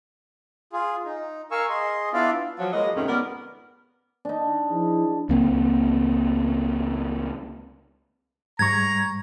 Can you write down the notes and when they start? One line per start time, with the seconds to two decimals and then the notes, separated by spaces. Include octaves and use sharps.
0.73 F4 G#4
1.05 D#4
1.51 A#4 F5 G#5 C#6 E6
1.69 G#4 D#5 C6
2.13 B3 D4 E4 F4 D5 F5
2.59 F3 F#3
2.73 G#3 A#3 G#4 B4 D#5
2.96 F2 G#2 C3 D#3 A3 C#4
3.08 B3 A#4 D5
4.25 D4 D#4
4.69 F3 E4 G#4
5.29 C#2 A#3 C4
8.59 G#2 G3 A#5 C#6 G#6